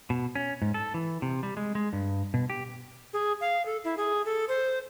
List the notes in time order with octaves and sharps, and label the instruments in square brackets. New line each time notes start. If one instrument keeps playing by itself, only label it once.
[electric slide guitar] B2
C#4
G#2
A4
E3
C3
G3
G#3
G#3
G2
B2
G4
[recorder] G#4
F5
A4
E4
G#4
A4
C5